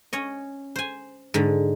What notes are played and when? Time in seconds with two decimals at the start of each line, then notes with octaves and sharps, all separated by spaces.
0.13 C#4 C#5 D#5
0.76 C5 G#5
1.34 G#2 D3